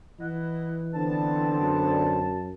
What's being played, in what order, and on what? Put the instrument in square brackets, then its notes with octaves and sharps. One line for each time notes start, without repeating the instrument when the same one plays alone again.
[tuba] E3 [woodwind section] E4 D#5 F#5
[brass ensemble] D3 B3 C4 [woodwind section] A5
[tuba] F#2